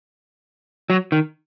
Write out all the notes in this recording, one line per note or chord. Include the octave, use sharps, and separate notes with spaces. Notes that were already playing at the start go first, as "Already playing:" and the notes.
F#3
D#3